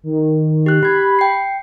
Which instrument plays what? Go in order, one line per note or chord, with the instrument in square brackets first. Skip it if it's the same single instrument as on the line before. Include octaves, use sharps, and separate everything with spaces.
[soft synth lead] D#3
[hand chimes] G4 F#6
[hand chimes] G4 G#6 [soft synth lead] B5
[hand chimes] G5 C7